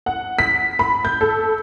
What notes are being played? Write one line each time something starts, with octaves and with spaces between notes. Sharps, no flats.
F#5
B6
B5
G6
A4